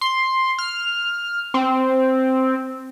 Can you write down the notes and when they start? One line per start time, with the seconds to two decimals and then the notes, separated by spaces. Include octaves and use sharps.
0.01 C6
0.58 F6
1.54 C4